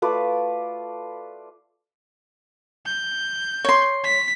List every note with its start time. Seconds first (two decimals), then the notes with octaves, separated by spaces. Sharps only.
0.02 A3 F4 B4 D5
2.86 G6
3.65 C#5 C6
4.04 B6